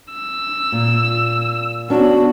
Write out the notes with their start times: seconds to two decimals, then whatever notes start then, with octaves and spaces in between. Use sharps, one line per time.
0.14 E6
0.72 A#2
1.90 B3 C#4 D4 F#4